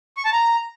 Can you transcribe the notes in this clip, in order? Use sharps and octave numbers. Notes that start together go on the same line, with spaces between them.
C#6
A5
A#5